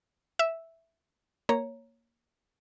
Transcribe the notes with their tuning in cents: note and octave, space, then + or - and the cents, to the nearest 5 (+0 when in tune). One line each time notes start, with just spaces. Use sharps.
E5 +0 E6 +0
A#3 +0 C#5 +0 A#5 +0